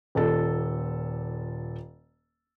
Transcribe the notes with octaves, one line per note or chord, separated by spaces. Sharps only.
D#1 A#2 A4